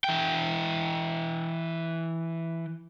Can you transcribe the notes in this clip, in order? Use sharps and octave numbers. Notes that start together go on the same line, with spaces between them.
E3 G5